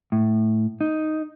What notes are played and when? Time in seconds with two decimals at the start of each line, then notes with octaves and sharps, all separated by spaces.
0.12 A2
0.81 D#4